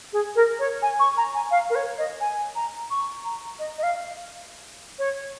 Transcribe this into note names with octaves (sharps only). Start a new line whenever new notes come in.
G#4
A#4
C#5
G#5
C#6
A#5
G#5
F5
A#4
C#5
D#5
G#5
A#5
C#6
A#5
D#5
D#5
F5
C#5